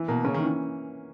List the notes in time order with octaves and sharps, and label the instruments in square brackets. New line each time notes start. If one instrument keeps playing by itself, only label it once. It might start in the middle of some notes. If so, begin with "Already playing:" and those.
Already playing: [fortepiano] E3
[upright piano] B2 [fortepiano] A#3
[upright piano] C#3 [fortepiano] C#4
[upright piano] D#3
[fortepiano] E3